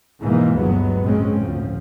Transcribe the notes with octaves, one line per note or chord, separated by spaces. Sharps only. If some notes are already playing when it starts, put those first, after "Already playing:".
G#2 B2 E3 G#3 A#3
G1 D2 G2 F#3 G#3 B3
A#1 A2 C#3 G#3 C4 C#4
D2 A2 F3